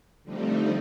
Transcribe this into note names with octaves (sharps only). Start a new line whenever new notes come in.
D3 F3 G3 A3 C4 D#4